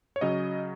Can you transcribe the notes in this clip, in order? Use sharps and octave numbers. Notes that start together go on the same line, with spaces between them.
C#5
C#3 F#3 C#4 D#5